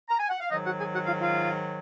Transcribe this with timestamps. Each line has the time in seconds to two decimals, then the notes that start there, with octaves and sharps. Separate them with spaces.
0.08 A#5
0.19 G#5
0.29 F#5
0.39 F5
0.50 G#2 D#3 F#3 D#4 D#5
0.64 F#4 F#5
0.78 G#4 G#5
0.92 F#4 F#5
1.05 F4 F5
1.19 F4 F5